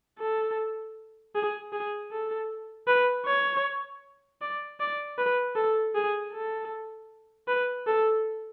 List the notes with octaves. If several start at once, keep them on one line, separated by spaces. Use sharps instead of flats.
A4
G#4
G#4
A4
B4
C#5
D5
D5
B4
A4
G#4
A4
B4
A4